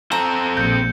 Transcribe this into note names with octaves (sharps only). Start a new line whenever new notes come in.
C4 A4 A#5
A#1 G6 C#7